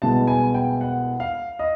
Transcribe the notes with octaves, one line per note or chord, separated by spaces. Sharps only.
C2 B2 G#3 B3 A5
G#5
G5
F#5
F5
D#5